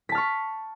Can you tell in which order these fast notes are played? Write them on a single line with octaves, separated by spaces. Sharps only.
B6 A5 F6 C#6